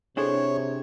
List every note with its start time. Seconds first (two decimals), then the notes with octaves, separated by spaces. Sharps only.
0.17 C3 D4 E4 G#4 A4 C5 C#5 G#5